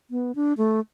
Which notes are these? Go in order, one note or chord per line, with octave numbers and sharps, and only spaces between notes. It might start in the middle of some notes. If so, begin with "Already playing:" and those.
B3
D4
A3